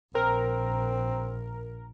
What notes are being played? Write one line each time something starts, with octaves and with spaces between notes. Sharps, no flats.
A#1 C4 A#4